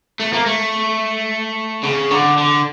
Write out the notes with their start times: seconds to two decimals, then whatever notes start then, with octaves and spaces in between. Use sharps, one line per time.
0.20 A3
0.33 A#3
0.46 A3
1.83 C#3
2.11 D3
2.38 D3